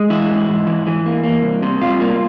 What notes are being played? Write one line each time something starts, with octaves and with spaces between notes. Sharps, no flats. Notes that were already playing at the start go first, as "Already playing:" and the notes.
Already playing: G#3
E3 E4
G#2
G#2
E3
E3
A#3
A#3
C2
C3
C2 F4
A#3